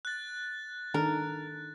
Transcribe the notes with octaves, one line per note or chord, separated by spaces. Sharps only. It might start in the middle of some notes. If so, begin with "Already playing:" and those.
F#6 A6
D#3 D4 A4 A#4